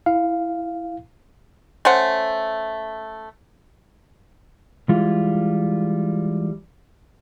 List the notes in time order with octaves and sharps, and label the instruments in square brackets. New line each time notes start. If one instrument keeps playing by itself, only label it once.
[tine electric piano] E4 F5
[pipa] A3 C#4 C5 F#5
[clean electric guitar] E3 G3 G#3 F4